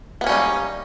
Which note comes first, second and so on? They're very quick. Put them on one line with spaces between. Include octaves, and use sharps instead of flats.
B3 A#3 C#4 G3 D#4